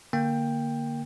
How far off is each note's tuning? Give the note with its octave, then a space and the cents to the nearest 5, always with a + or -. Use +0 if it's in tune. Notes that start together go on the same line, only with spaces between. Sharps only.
D3 +0 A#3 +0 G5 +10